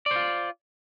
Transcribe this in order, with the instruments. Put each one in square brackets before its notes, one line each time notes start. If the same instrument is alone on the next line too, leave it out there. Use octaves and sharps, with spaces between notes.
[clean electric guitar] D5
C5
F4